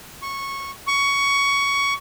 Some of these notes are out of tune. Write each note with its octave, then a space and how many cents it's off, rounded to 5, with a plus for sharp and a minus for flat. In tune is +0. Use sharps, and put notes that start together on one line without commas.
C#6 -10
C#6 +15